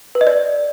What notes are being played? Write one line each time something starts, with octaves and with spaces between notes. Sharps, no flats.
B4
D#5
D5